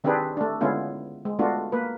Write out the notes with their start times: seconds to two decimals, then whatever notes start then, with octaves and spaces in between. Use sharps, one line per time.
0.04 D#3 C4 D4 G4 G#4 B4
0.37 A3 D4
0.61 D3 G#3 B3 C#4 E4 F4
1.25 G#3
1.39 G#3 A3 B3 D4 F4 F#4
1.72 A#3 B4